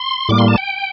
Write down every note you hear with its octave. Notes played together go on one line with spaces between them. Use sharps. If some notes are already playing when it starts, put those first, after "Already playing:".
Already playing: C6
A2 G3 A#3 D6
C6
A5
G5